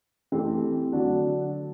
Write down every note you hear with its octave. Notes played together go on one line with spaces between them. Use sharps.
E3 A3 C4 G4
D3 F#3 A3 D4 F#4